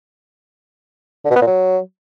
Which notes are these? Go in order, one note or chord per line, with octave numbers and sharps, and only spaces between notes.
D3
B2
B3
A#2
F#3